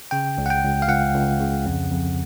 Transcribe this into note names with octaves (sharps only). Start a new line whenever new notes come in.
C#3 G5
C#2
F#5
G5
C#2
F5
C#2 F#5
C#2
C#3
F2
F2